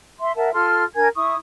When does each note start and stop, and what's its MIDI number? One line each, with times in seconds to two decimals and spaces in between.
0.19 0.35 76
0.19 0.35 84
0.36 0.51 70
0.36 0.51 76
0.36 0.51 78
0.36 0.51 81
0.53 0.84 65
0.53 0.84 69
0.53 0.84 84
0.53 0.84 89
0.95 1.08 62
0.95 1.08 70
0.95 1.08 80
0.95 1.08 92
1.16 1.35 64
1.16 1.35 85
1.16 1.35 87